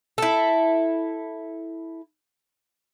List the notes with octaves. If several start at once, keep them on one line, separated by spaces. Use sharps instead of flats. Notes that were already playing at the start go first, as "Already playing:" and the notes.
E4 A4